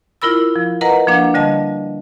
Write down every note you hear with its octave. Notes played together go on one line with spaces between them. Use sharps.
E4 F4 A#4 B5 E6
F3
A#4 B4 D#5 F#5 A#5
F3 A#3 D4 F#5
D3 G3 D#5 A5